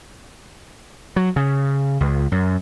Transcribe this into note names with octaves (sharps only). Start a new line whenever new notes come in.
F#3
C#3
C#2
F#2